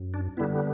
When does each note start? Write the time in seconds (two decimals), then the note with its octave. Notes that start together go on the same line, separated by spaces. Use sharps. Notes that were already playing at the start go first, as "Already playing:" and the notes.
Already playing: F#2
0.14 D4
0.37 D3 G3 B3 E4